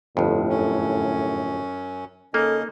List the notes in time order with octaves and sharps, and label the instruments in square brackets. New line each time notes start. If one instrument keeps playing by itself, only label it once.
[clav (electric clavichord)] G1 F2 [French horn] A2
[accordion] F#2 C#4
[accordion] C#3 C#4 D#5 [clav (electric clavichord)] A#3 D#4 [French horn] A4